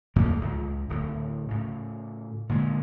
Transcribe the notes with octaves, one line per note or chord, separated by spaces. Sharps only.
E2 A2 F3 A#3
C#2
D1 A2
A2 C#3
A#2 D3 G#3